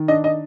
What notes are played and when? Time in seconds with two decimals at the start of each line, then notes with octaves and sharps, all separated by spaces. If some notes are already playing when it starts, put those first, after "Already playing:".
Already playing: D#3
0.08 D4 D#5
0.24 D#5